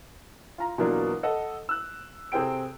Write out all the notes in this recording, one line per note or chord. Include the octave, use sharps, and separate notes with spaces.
F4 A#5
B2 E3 F#3 A#3 D4 F4
A4 D#5 F#5
E6 F#6
C3 C4 G#4 A4 G5 D7